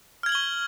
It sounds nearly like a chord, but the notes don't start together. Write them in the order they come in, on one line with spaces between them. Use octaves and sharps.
F6 G#6 F#7 G7 C#6